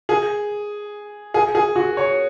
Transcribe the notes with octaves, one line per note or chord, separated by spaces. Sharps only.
G#4
G#4
G#4
F#4
C#5